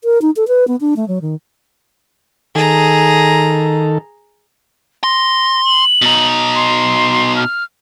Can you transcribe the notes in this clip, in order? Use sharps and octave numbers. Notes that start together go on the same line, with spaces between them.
A#4
D#4
A4
B4
B3
D4
A3
F#3
D#3
D#3 G#4 A4 A#5
C6 A#6
F#7
B2 D#4
C6
F6